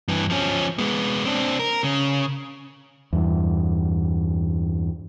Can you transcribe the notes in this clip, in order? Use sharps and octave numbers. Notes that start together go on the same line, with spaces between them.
G2 E3
F3 C#4
G#3 B3
C4 D4
A#4
C#3
E2 G2